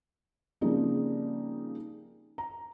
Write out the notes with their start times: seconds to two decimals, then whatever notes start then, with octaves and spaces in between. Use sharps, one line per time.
0.61 C#3 F3 G3 A#3 C4 D#4
2.38 A#5